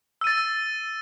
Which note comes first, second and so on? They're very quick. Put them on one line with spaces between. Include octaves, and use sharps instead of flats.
E6 D#7 A6